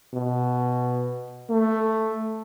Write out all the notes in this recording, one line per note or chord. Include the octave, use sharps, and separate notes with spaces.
B2
A3